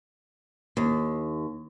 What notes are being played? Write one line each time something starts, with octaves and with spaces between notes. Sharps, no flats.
D#2